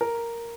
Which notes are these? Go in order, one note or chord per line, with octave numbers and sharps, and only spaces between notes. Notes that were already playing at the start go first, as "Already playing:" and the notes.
A#4